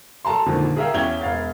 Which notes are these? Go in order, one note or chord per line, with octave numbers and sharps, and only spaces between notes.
A4 A5 A#5 C6
F2 A#2 D3 D#3
G#4 A#4 E5 F5 G5
E2 C#4 E4 G5 G#6 G7
E1 F5 A6